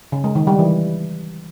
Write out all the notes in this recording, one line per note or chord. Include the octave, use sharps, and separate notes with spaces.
C#3
G#3
D#3
G3
E3